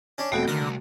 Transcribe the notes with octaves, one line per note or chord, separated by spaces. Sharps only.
C#4 D4
E1 F2 B2 A3 F#4 G5
D#2 D3 A#4
C2